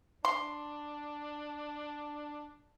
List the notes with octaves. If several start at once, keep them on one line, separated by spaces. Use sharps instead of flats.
D4 C6